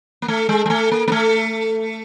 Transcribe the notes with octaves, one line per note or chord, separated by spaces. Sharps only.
A#3
A3
G#3
G#3
A3
A#3
A#3
A3